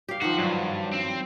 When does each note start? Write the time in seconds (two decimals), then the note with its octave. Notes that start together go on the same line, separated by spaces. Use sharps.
0.09 G4 F5
0.22 D#3 F3 F#4
0.39 G2 F#3
0.93 C4